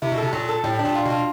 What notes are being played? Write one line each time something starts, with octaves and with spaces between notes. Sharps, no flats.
C3 E4
B2
C3 A4
A#2 F#3
A4
A2 G3
D4
A#2
F4
B2 F4